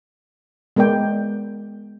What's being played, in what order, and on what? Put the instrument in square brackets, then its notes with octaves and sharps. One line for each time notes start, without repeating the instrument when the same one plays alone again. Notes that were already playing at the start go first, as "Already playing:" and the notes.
[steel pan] G#3 B3 A#4 D5 G5